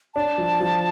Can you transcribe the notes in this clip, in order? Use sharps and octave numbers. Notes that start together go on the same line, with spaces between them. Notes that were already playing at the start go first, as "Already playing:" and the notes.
D4 A5
F3
F3